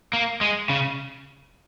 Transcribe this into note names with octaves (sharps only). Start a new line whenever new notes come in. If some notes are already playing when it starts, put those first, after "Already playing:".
A#3
G#3
C#3